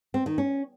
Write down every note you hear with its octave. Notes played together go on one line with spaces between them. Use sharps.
C4
D#3
C#4